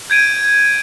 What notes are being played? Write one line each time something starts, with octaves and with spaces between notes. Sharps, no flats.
G6 G#6 D7 D#7